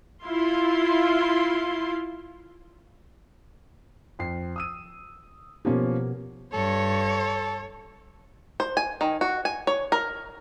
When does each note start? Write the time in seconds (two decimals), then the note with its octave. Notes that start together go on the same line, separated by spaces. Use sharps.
0.22 E4 F4 F5 C6
4.19 F2 C7
4.56 D#6 E6 D#7
5.65 B2 F3 A#3 B3 C#4 G4
6.53 G2 A4 C#5
8.60 C5
8.77 G#5
9.01 D#3
9.21 F#4
9.45 G#5
9.67 C#5
9.92 A#4